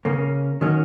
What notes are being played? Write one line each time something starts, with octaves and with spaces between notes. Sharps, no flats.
C#3 A#3 C#4
D#3 F#3 A#3 C#4